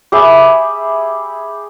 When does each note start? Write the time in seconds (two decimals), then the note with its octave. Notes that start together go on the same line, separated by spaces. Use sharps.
0.12 G4 G#4 E5 B5